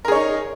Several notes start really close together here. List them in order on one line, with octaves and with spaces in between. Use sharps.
A#4 G#4 C#5 D#4